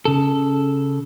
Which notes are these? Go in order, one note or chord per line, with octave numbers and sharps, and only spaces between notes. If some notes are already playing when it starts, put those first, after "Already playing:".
C#3 A4